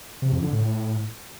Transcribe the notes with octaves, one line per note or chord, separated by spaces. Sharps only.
C3
F2
D3
A2